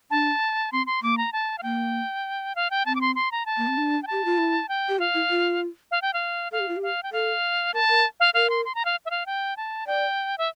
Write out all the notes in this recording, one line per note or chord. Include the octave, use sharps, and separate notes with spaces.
D4 A5
C4 C6
C6
A#3 D6
A#5
A5
F5
A#3 G5
F5
G5
C4 A5
D6
C6
C6
A#5
A5
A#3
C4
D4
G5
G4 A5
F4
E4
G5
G4
F4 F5
E4
F4
F5
G5
F5
A4 F5
G4
F4
G4
F5
G5
A4 F5
A#4 A5
A#4
F5
A#4 F5
C6
C6
A#5
F5
E5
F5
G5
A5
D5 G5
E5